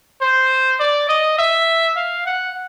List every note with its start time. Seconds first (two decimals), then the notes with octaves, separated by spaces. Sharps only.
0.22 C5
0.80 D5
1.09 D#5
1.39 E5
1.97 F5
2.26 F#5